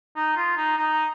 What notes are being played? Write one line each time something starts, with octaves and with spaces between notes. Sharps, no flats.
D#4
F4
D#4
D#4